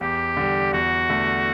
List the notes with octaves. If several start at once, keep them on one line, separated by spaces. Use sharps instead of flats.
E2 G4
D3 G3
E2 F#4
D3 A3